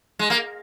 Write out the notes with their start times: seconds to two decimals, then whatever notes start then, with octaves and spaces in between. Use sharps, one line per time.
0.19 G#3
0.30 A#3